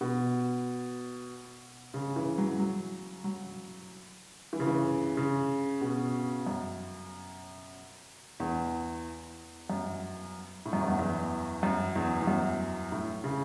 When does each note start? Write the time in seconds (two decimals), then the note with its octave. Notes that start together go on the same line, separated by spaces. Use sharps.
0.01 B2
1.94 C#3
2.16 E3
2.38 F#3
2.59 F#3
3.24 F#3
4.53 E3
4.60 C#3
4.67 E3
5.17 C#3
5.81 B2
6.47 F#2
8.40 E2
9.70 F#2
10.66 A2
10.73 F#2
10.81 E2
10.88 F#2
10.99 E2
11.63 F#2
11.96 E2
12.22 E2
12.27 F#2
12.92 A2
13.24 C#3